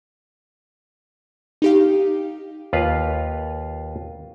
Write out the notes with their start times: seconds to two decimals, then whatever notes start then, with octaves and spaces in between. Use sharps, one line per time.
1.62 D#4 G4 F5
2.73 D#2 F4 B4 F5